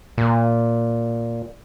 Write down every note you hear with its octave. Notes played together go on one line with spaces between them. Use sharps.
A#2